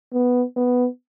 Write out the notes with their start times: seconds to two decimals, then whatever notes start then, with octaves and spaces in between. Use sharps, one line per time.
0.13 B3
0.57 B3